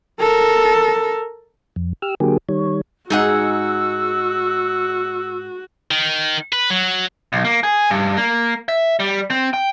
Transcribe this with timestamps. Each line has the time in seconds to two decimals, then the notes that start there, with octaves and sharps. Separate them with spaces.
0.20 A4 A#4
1.76 F2
2.02 G4 E6 F6
2.20 D3 F#3 A#3 G4 G#4
2.49 D#3 G3 C#5
3.10 G#2 D#4 F#4 G#4 F#5 E6
5.91 D#3
6.53 B4
6.70 F#3
7.33 B1
7.45 A#3
7.63 G#4
7.90 G2
8.17 A#3
8.69 E5
9.00 G3
9.31 C4
9.54 G5